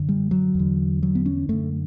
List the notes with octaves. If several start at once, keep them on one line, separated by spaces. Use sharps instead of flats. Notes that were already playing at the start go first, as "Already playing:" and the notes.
Already playing: F#2 D3
G3
F#3
E2 D3
F#3
B3
C#4
F#2 D3 A3